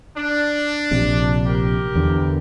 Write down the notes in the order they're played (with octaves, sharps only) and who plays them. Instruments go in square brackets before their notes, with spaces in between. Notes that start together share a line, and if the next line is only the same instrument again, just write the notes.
[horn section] D4
[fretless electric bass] A#1 C3
[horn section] G4 A#4
[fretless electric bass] E2 D3